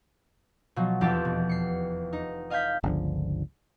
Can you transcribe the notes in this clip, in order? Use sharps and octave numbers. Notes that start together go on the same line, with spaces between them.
B2 F3 F#3
F1 E2 F3 C4 G4 A5
B2
C7 C#7
D#4
D#5 F5 G#5 D#6 G6 B6
G1 C#2 D3 F3